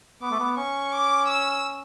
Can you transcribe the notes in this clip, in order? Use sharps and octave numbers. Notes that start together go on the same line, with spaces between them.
B3 D6
A3
B3
C#4 C#6
D6
E6